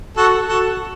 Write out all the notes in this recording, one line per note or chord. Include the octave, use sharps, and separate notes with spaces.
F#4 A4
F#4 A4